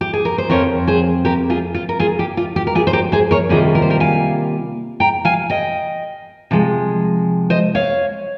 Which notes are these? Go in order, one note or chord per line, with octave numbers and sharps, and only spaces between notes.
G4
G#4
A#4
C5
F2 C#3 F3 C4 A#4 C#5
G#4 C5
G4 A#4
F4 G#4
F4
A#4
F4 G#4
G4
F4
G4
A#4
F4 G#4
C5
G4 A#4
G#4 C5
A#4 C#5
C3 D#3 G3 A#3 F4 G#4 C5
A#4
C5
G4 A#4
F5 G#5
G5 A#5
F5 G#5
D#5 G5
C3 F3 G#3
C5 D#5
C#5 F5